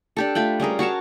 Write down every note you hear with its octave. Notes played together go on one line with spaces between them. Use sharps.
D4 G4 A4
A3 F4 G5 B5
G3 C#4 G#4 A#4
F#4 A#4 C#5 A5